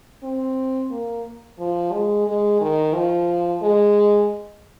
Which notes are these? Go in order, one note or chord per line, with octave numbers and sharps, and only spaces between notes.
C4
A#3
F3
G#3
G#3
D#3
F3
G#3